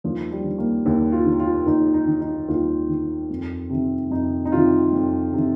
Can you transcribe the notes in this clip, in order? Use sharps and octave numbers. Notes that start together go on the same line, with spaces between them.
D#2 F3
G3
D#3
A#3
D#2
F4
D#3
F4
D#2 D#4
D#4
D#3
D#4
D#2 F4
D#3
F2
C3 D#3
F2 D#4
D#4
C3 D#3 F4
F2
C3 D#3